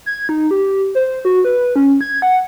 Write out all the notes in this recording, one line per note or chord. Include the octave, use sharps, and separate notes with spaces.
G#6
D#4
G4
C5
F#4
B4
C#4
G#6
F#5